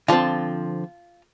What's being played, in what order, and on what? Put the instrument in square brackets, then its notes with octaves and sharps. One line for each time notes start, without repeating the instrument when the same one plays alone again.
[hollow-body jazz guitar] D3 F3 C4 [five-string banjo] F4 A5